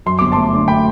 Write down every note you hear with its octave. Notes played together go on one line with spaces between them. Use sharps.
F#2 C6
G1 D6
A3 A5 C6
D3
A3 G5 B5